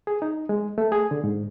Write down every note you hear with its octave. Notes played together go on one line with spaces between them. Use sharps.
G#4
D#4
G#3
A3
G#4
D3
G#2